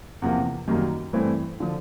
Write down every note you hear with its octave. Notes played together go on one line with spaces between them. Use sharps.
E2 C3 F3 A#3
F#2 D#3 G3 A#3
G2 E3 A3 C4 E4
D3 F3